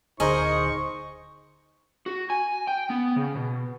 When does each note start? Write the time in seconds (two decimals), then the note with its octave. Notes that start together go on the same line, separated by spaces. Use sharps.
0.20 D1 D3 D#4 G#4 A#4 C5 D#5 C#6
2.06 F#4
2.30 G#5
2.67 G5
2.90 B3
3.16 C#3
3.35 B2